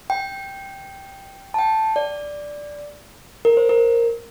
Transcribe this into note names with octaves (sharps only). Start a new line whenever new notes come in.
G5
A5
G5
D5
A#4
C5
A#4